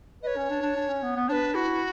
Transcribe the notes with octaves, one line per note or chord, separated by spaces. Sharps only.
B4 C#5 D#5
C#4
D4
D4
D4
C#4
B3
B3
D4 B4 C#5
E4 F#4